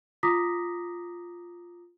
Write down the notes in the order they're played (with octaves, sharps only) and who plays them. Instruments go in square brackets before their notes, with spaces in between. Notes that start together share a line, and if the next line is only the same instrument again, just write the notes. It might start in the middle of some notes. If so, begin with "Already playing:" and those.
[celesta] F4 A#5 D6 D#6 A#6 B6